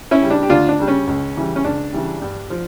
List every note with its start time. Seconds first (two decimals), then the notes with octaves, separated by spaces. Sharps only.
0.11 C#4 E4
0.21 C#3 G3
0.30 D4
0.43 G4
0.49 D2 D4 F4
0.69 D4
0.79 C#3 G3
0.88 C#4
1.07 C#2
1.36 C#3 E3 G3
1.56 C#4
1.64 C#2 D4
1.93 C#3 E3 G3
2.22 G2
2.50 F3